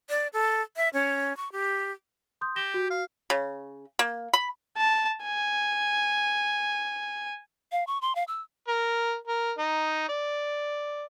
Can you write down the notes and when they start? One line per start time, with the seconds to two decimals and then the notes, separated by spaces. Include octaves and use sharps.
0.09 D5
0.33 A4
0.76 E5
0.94 C#4
1.37 C#6
1.52 G4
2.41 C6 D#6 G6
2.56 G4 A#6 E7 G7
2.74 F#4
2.90 F5
3.30 C#3
3.99 A#3
4.34 B5
4.77 A5
5.24 G#5
7.72 F5
7.87 C#6
8.02 C6
8.15 F5
8.28 E6
8.68 A#4
9.27 A#4
9.58 D#4
10.09 D5